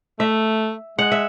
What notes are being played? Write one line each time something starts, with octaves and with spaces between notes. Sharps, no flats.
A3 E5
G#3 F#5
E5